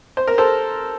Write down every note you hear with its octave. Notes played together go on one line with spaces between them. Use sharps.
C5
A#4
A4 C5